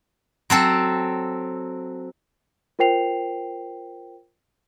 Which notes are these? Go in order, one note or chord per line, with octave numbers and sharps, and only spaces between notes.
F#3 C4 A4
F4 A#4 C5 G5 C7 F7